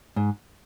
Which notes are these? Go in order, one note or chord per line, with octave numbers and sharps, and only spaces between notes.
G#2